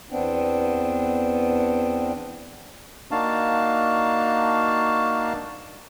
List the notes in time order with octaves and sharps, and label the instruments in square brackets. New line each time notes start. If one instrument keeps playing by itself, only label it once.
[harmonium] E2 B3 C4 D4
[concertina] A#3 D4 D#4 F#4 F5 A5